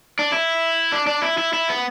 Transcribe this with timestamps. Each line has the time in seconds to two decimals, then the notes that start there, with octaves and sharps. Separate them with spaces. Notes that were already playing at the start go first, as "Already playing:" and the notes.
0.19 D4
0.32 E4
0.92 D4
1.07 D4
1.22 E4
1.38 E4
1.53 E4
1.69 B3